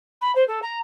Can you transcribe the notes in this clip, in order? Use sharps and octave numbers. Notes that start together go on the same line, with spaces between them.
B5
C5
A4
A#5